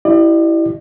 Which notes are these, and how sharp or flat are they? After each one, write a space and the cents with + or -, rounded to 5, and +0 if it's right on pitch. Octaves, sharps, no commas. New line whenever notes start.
E4 +0 G4 -35 D5 +40